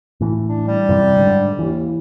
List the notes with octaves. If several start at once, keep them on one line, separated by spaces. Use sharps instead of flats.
A2 E3
D4
G3
F#2 C3 E3
G#2 D3
D#2 E3